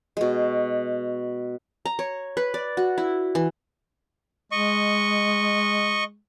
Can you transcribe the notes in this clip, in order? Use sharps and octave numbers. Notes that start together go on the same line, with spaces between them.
B2 G#3
A#5
C#5
B4
D5
F#4
E4
E3
G#3 D#5 C#6